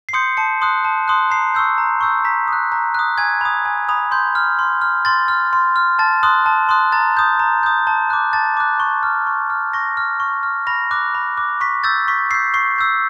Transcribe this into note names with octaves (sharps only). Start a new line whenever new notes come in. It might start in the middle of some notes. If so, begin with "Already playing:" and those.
C7
C6 D#6 G6 C#7
A5 C#7
C6 D#6 F#6
A5
C6 D#6 F#6
A#5 C7
C#6 E6 G6
A#5
C#6 E6 G6
A#5 B6
D#6 F#6
A#5
D#6 F#6
G#5 G#6
B5 D#6
G#5
B5 D#6
C6 G6
F6
C6
F6
C6 A6
F6
C6
F6
A5 A6
C6 D#6 F#6
A5
C6 D#6 F#6
A#5 A6
D#6 G6
A#5
D#6 G6
A5
D6 F#6
A5 A6
D6 F#6
C#6
F6
C#6
F6
C#6 A#6
F6
C#6
F6
B5 A#6
D6 F#6
B5
D6 F#6
C#6 B6
E6 G6 A6
C#6 B6
E6 G6 C7
C#6 C7
E6 G6